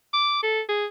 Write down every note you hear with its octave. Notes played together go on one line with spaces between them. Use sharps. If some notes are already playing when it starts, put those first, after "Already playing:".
D6
A4
G#4